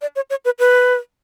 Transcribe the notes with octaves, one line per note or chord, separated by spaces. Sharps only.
D5
C#5
C#5
B4
B4